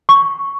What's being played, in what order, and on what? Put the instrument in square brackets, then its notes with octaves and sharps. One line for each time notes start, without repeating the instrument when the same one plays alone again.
[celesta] C#6